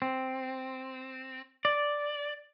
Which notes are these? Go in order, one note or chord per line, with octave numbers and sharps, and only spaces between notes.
C4
D5